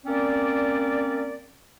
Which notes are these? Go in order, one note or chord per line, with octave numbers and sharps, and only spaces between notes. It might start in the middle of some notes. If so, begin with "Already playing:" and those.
A#3 C4 C#4 D5